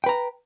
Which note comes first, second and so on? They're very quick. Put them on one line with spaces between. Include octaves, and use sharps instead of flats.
G5 B4 A#5